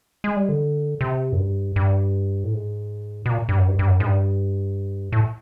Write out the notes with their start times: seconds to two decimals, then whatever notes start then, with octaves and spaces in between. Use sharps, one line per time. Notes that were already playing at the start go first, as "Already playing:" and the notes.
0.24 G#3
0.36 G3
0.49 D3
1.01 C3
1.32 F#2
1.39 G2
1.76 G2
2.44 A2
2.53 G#2
3.26 B2
3.30 A#2
3.49 G2
3.58 F#2
3.68 G2
3.79 G2
3.88 F#2
4.00 G#2
4.06 G2
5.12 A2